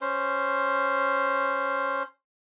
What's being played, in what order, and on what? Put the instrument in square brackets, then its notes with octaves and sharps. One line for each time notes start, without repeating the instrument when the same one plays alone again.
[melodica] C#4 C5